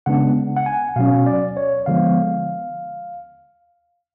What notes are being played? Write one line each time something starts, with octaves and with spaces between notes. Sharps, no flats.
C#3 G#3 B3 D4 F#5
F#5
G#5
B2 F#3 C#4 F5
D5
C#5
D3 F3 G#3 B3 F5